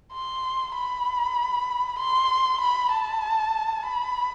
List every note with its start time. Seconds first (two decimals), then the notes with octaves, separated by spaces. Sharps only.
0.13 C6
0.75 B5
1.99 C6
2.61 B5
2.92 A5
3.85 B5